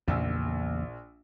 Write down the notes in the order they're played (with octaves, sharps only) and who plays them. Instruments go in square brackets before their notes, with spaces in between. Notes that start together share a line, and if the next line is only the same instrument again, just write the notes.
[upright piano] A#1 E6 [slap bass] E2 C#3 A#3